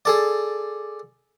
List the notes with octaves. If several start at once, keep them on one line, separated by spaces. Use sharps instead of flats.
G#4 A4 D5